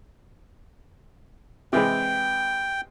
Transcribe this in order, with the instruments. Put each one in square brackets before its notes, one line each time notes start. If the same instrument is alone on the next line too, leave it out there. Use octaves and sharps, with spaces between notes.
[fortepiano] C3 E3 G#3 [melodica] G5